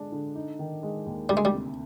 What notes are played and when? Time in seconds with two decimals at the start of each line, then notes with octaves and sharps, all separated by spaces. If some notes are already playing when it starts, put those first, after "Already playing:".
Already playing: D3 G#3 D4
0.12 D3
0.36 D#4
0.59 D#3
0.83 G#3
1.06 D#2
1.29 D2 G3
1.37 G#3
1.45 G3
1.54 C3